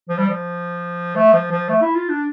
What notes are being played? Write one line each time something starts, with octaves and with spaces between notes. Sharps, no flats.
F3
G3
F3
A3
F3
F3
A3
E4
F4
D4